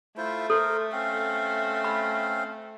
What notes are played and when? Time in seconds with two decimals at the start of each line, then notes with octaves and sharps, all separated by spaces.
0.17 A3 E4 F4 C5
0.50 A4 A#4 C5
0.92 C4 C#4 F5
1.84 B5